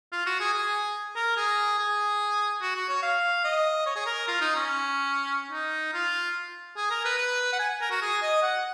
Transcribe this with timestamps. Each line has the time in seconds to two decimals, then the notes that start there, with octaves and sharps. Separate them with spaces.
0.12 F4
0.26 F#4
0.40 G#4
0.53 G#4
1.16 A#4
1.37 G#4
1.79 G#4
2.61 F#4
2.76 F#4
2.89 C#5
3.02 F5
3.44 D#5
3.86 C#5
3.96 G#4
4.06 A#4
4.28 F4
4.41 D#4
4.56 C#4
5.52 D#4
5.93 F4
6.77 G#4
6.91 A#4
7.05 B4
7.18 B4
7.53 F#5
7.59 G#5
7.81 A#4
7.91 F#4
8.02 G#4
8.22 D#5
8.42 F#5